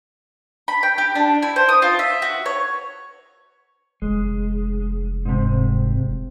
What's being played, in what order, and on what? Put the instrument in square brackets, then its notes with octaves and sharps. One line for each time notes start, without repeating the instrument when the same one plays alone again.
[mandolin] B5
G5
G4
D4
E4
C5
D#6
F4
E5
F#4
C#5
[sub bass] F1 [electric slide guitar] G#3
[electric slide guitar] G#2 C3